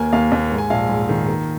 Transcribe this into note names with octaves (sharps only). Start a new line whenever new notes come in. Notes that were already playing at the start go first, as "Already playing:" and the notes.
Already playing: D#2 A#3 G#5
D#2 F5
D#2
G#2
G#5
A#1 F5
G#2
D#3
A#3